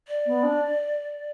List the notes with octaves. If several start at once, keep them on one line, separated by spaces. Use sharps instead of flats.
D5
B3
D4